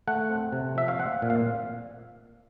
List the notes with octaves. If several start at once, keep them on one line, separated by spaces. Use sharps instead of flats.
A3 F#5
C4
C3
F3 E5
F5
C4 F#5
A#2
F5